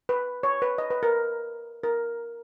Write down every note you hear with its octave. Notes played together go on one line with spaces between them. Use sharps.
B4
C#5
B4
D#5
B4
A#4
A#4